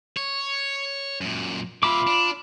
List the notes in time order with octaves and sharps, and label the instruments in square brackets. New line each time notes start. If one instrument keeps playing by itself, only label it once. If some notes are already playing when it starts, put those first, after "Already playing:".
[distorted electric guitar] C#5
F#2 A#2
[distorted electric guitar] A#2 E5 [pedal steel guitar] F4 B5 D6
[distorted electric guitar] D4